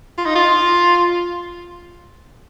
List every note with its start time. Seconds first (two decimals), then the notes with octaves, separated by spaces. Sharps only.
0.18 F4
0.26 D#4
0.35 F4